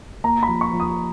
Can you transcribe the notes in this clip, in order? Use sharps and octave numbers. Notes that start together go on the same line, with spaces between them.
A#3 A#5
B5
F3
C#6
F3
D#6